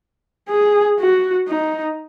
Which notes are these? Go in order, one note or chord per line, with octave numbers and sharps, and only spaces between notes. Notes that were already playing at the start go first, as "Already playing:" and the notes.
G#4
F#4
D#4